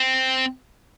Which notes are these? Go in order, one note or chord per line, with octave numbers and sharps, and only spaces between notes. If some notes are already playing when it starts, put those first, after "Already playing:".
Already playing: C4